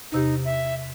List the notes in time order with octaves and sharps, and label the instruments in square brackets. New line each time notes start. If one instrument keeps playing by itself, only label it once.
[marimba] E2 C3 G4 [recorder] D#4
[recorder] E5